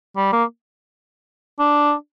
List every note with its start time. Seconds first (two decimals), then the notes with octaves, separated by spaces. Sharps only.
0.17 G3
0.32 A#3
1.59 D4